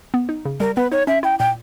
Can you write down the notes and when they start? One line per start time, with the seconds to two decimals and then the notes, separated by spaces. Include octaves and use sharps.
0.14 B3
0.29 D#4
0.45 C#3
0.60 G3 A#4
0.76 B3 B4
0.92 D#4 C#5
1.07 C#4 E5
1.23 E4 G5
1.39 A#2 G5